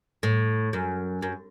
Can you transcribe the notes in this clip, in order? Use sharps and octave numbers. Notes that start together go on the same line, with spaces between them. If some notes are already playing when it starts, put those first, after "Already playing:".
A2
F#2
F#2